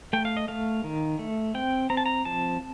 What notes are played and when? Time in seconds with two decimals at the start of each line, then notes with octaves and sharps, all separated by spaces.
0.13 A3 G5
0.25 F5
0.37 D#5
0.48 A3 F5
0.84 D#3
1.19 A3
1.54 C4 G5
1.90 C4 A#5
1.97 A5
2.06 A#5
2.25 F3 A5